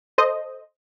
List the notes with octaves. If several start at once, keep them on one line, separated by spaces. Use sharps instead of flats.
A4 C5 D#5